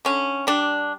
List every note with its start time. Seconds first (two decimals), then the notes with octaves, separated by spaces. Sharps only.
0.05 D3 C#4
0.47 G3 D4